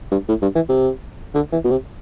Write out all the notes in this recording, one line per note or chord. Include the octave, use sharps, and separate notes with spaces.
G2
A2
G2
E3
C3
D3
E3
B2
C3